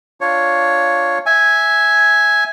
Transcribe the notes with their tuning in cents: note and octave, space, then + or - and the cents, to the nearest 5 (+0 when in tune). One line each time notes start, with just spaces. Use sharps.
D4 +0 F4 +0 C#5 +0
E5 -10 G#5 +0